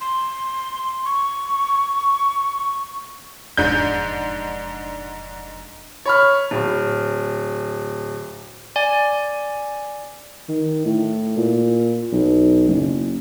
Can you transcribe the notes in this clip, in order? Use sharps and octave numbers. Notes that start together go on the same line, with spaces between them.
C6
C#6
E1 F2 G#2 D4 G6
C#5 B5 F6
D1
D5 G#5
D#3
A2
A#2
B1
F#1